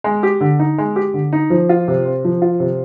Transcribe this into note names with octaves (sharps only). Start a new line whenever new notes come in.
G#3
G4
D3
D#4
G#3
G4
D3
D#4
F3
F4
C3
C4
F3
F4
C3